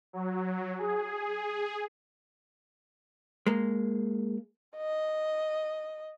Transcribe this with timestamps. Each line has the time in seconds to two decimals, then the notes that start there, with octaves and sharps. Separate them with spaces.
0.13 F#3
0.78 G#4
3.47 G#3 A#3
4.77 D#5